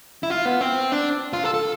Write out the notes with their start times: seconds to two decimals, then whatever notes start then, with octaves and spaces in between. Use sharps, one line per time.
0.23 E4
0.30 F4
0.45 B3
0.61 C4
0.92 D4
1.33 F4
1.44 A4
1.54 A4